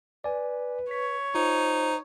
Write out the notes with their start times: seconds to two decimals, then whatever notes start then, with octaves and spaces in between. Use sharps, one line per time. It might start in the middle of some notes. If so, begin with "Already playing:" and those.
0.24 B4 D5 G#5
0.91 C#5 B6
1.35 D#4 F4 C5